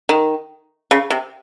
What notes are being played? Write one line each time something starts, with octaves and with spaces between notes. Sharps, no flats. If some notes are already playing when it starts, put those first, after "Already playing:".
D#3
C#3
C3